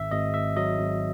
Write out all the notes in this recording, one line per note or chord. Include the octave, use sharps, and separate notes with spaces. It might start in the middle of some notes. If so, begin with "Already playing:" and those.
Already playing: G#1 E5
G#1 D#5
G#1 E5
F#3 D#5
G#1